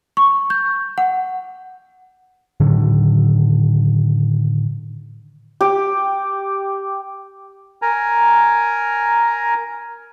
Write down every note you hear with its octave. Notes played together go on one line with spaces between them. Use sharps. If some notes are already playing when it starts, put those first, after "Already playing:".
C#6
G6
F#5
A2 D3 D#3 F#3
G4
A#4 G#5 A#5